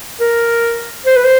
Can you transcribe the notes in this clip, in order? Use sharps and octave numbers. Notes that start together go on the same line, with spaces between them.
A#4
C5
B4
C5